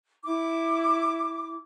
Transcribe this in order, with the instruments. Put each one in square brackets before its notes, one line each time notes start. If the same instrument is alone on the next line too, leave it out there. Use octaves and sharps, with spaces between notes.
[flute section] E4 D6